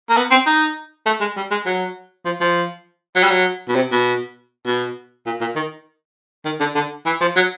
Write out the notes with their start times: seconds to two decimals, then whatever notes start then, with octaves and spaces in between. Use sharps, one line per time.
0.10 A#3
0.17 B3
0.31 C4
0.46 D#4
1.06 A3
1.20 G#3
1.36 G3
1.51 G#3
1.66 F#3
2.25 F3
2.41 F3
3.16 F#3
3.23 G3
3.31 F#3
3.68 B2
3.76 C3
3.91 B2
4.66 B2
5.26 A#2
5.41 A#2
5.55 D#3
6.45 D#3
6.60 D3
6.75 D3
7.06 E3
7.21 F3
7.36 F#3